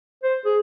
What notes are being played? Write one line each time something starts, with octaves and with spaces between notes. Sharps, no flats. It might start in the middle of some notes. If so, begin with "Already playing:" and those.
C5
G#4